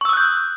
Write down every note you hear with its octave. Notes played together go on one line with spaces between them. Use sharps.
C#6 D#6 E6 F#6 G6